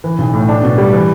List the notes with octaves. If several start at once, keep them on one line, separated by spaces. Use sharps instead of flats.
E3
B1
A2
D4
B2
G3
E3